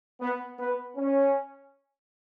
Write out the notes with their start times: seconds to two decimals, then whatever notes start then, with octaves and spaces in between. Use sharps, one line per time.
0.20 B3
0.58 B3
0.96 C#4